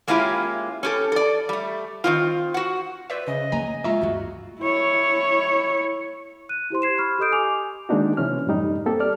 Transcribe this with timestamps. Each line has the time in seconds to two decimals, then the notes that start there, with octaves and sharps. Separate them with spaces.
0.08 G#3 A#3 C#4 E4 F4 G4
0.83 C#4 G4 A4
1.12 A4 D5
1.49 G3 A3
2.04 D#3 C4 F4
2.54 F#4 F#5
3.10 B4 C5 D5 E5
3.27 C#3 D#5
3.52 A#3 D#4 G#5 A#5
3.84 G#3 F4 E5 A#5 C#6
4.01 D2 G2 F#4
4.60 E4 C#5
6.49 F#6 D#7
6.70 E4 G4 C5 C6
6.82 G#6 C7 E7
6.98 B5 C#6 F6
7.19 G4 A4 D#5 D#6 G6 D7
7.32 G#5 D6 F7
7.89 D#3 G#3 A#3 D4 D#4 F#4
8.17 C3 E3 C#4 F6
8.47 F#2 A2 G3 D#4
8.86 A#3 C4 G4 A4
9.00 D5 F6